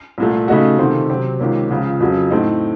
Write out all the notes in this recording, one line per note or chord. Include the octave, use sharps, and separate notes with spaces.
C2 A#2 A3
C#3 A3 D#4 F#4
C3 D#3 A3 C4 F4
C3 F#3 C4 F#4
C#2 C3 D#3 A#3 C#4
C#2 C#3 F3
F2 C#3 F#3
A2 A3 C4 D#4